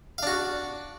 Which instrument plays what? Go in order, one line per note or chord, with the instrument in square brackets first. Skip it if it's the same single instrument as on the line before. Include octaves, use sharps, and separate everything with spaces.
[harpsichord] F5
D4
F#4